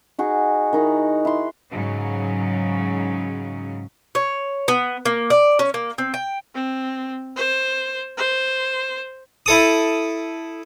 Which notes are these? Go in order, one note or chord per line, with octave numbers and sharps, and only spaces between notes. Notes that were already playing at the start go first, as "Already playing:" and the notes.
D#4 F#4 G#4
D#3 D#4 E4
E4 C6
G#2 C#3 F#3
C#5
B3
A#3
D5
C#4
A#3
C4
G5
C4
C5
C5
E4 A4 D#6